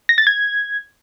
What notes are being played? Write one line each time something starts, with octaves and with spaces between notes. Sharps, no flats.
A#6
A6
G#6